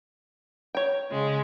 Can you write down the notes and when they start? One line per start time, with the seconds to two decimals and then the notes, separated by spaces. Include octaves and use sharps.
0.75 C#5 G5
1.11 C#3 G#3